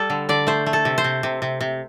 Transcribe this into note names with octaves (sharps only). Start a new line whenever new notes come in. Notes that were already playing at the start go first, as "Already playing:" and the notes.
Already playing: G3 A4
D3
D3 D5
A3 C5
A3
A4
C3
C5
C3
C3
C3
C3